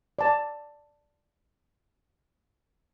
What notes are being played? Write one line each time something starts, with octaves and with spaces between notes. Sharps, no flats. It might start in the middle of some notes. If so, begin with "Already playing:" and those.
D5 A5